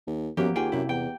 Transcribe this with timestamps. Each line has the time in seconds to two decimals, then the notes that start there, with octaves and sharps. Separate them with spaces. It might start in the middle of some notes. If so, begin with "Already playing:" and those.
0.07 D#2
0.37 F#2 F3 A#3 B3 G4
0.56 D#2 F4 G#4 G5 G#5
0.72 F#2 C3 E4
0.89 E2 G5